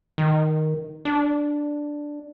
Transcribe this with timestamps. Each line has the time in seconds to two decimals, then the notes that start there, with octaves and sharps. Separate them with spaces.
0.18 D#3
1.05 D4